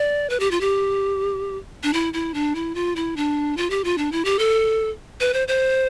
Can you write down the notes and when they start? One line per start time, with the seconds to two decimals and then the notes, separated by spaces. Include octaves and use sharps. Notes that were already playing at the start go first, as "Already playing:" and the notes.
Already playing: D5
0.30 B4
0.40 G4
0.51 F4
0.61 G4
1.83 D4
1.93 E4
2.13 E4
2.34 D4
2.55 E4
2.75 F4
2.96 E4
3.16 D4
3.57 F4
3.70 G4
3.84 F4
3.98 D4
4.12 E4
4.25 G4
4.39 A4
5.20 B4
5.34 C5
5.48 C5